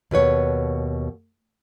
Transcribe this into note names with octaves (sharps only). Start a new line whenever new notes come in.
D#2 B2 B4 C#5